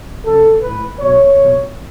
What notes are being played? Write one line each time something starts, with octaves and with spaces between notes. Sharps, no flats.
C#3 F#3 A4
A2 E3 B4
B2 F#3 C#5
B2 F#3